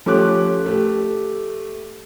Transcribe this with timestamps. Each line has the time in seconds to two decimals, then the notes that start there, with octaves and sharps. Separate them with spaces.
0.06 F3 A3 C#4 G4 D6 F#6
0.66 A3 G4